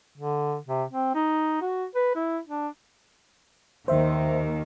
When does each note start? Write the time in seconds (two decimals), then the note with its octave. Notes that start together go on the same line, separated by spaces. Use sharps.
0.18 D3
0.68 C3
0.90 C4
1.15 D#4
1.61 F#4
1.95 B4
2.15 E4
2.47 D4
3.88 D#2 D#3 C5 E5